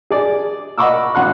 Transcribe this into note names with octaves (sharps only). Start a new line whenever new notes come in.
G#4 D5
D#5 F#5 B5 C#6 D6 E6
G#1 F#5 C6 F#6